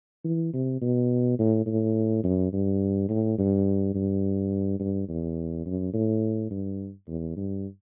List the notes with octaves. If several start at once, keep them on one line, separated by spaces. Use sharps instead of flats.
E3
C3
B2
A2
A2
F#2
G2
A2
G2
G2
G2
E2
F#2
A2
G2
E2
G2